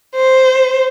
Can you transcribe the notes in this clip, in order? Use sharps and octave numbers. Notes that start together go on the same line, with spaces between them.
C5